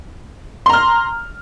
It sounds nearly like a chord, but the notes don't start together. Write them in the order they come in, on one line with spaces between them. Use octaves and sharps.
C6 A#5 F6